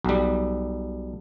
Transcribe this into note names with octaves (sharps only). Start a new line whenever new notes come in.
B1 G3